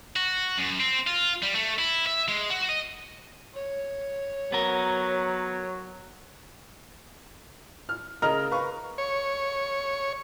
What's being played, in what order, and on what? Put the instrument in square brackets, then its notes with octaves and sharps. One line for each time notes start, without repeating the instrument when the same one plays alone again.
[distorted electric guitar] F#4
F#2
C4
F4
G3
A3
E4
E5
G#3
F#4
D#5
[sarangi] C#5
[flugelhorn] F#3 [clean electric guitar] B3 A#4
[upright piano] F6
[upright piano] C#3 D#5 F7 [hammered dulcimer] A#4
[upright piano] B4 F5 C#6
[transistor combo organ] C#5